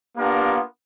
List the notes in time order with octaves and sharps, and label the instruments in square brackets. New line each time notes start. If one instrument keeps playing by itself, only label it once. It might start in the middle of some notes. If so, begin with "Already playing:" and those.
[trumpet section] A#3 B3 D4 F4 G4 A#4